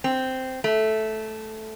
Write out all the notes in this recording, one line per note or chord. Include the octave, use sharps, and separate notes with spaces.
C4
A3